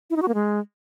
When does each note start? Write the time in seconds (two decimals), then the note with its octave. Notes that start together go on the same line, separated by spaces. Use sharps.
0.10 E4
0.16 D#4
0.22 F#4
0.28 A#3
0.34 G#3